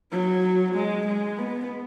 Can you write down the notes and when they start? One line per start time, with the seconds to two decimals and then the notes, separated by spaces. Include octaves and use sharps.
0.12 F#3
0.75 G#3
1.07 G#3
1.38 B3